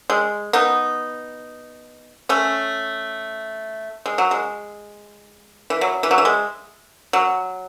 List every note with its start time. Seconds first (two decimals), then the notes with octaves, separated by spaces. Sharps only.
0.10 G#3
0.53 B3 D#4
2.29 A3 C#4
4.06 G#3
4.18 F#3
4.31 G#3
5.70 E3
5.81 F#3
6.03 E3
6.11 F#3
6.18 E3
6.25 G#3
7.13 F#3